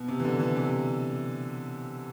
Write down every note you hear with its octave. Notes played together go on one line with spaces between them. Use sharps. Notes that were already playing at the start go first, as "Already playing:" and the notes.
Already playing: B2
C3
E3
D3
E3
C3